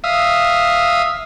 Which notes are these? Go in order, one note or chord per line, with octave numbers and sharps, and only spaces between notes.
E5 F5 D#6